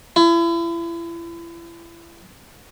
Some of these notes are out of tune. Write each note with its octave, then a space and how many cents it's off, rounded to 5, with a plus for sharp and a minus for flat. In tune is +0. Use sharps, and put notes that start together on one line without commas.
E4 +35